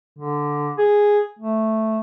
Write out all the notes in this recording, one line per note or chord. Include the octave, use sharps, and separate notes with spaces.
D3
G#4
A3